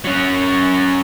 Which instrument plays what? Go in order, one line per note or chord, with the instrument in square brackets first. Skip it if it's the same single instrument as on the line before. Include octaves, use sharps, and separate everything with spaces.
[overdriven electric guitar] F#3 C#4